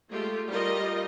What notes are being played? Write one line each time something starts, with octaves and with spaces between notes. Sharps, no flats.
G#3 A3 F4 G4
G3 F4 G4 A#4 D#5